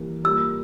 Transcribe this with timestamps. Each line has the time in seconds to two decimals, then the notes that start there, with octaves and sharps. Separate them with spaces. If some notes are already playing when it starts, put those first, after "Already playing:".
Already playing: E3 G3 A#3
0.24 G3 A#3 F4 E6